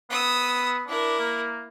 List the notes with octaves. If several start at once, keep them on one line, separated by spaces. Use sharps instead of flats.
B3 D#6 E6
D4 E4 A#4
A#3